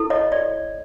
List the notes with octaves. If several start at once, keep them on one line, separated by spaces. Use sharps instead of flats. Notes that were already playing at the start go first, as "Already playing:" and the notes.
Already playing: E4 A4
C#5 D#5
D5